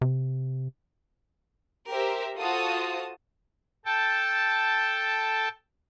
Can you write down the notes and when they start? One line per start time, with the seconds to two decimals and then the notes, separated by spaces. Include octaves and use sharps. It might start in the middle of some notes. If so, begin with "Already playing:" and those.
0.01 C3
1.88 G4 A#4 C5 E5
2.38 F4 F#4 A4 C5 A5 D#6
3.85 A4 G5 A5